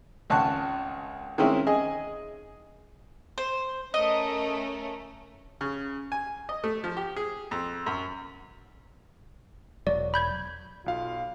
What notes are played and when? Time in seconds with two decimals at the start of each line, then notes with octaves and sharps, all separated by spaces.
0.30 G#1 C#2 A5 C#6 F#6
1.38 D#3 G#3 C4 C#4 E4
1.67 G#4 D#5 G#5
3.38 C5
3.94 A3 C#4 A#4 D#5
5.61 C#3
6.12 G#5
6.49 D#5
6.64 A3
6.84 F3
6.97 G4
7.17 G#4
7.51 F2
7.86 F#2
9.87 E1 F#3 D5
10.14 B5 G6 G#6
10.86 B1 F4 F5